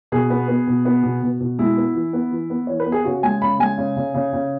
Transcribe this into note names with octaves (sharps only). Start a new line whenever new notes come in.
B2 G#4
B3
B3
B2
B3
B2
B2
B2
G#3 E4
B3
E3
B3
E3
B3
E3 C#5
B4
B3
G#4
C#3 F#4
G#3 G#5
C#3 B5
G#3 G#5
C#3
C#3
C#3
C#3